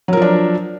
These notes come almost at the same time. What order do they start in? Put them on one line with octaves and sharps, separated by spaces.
F#3 A#4 F3 D4